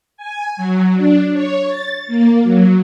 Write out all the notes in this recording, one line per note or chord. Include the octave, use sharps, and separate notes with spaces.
G#5
F#3
D4
C#5
A6
A#3
F#3